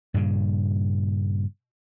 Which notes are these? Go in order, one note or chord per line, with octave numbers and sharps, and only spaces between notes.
G2 A#2 C#3